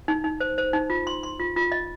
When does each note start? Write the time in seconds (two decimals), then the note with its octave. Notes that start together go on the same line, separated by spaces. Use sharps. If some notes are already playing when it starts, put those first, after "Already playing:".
0.08 D#4
0.24 D#4
0.40 C5
0.58 C5
0.73 D#4
0.90 F4
1.07 C6
1.23 C6
1.39 F4
1.56 F4
1.72 D#5